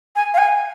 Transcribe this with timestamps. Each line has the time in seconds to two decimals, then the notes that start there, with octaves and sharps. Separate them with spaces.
0.16 G#5
0.34 F5
0.38 G#5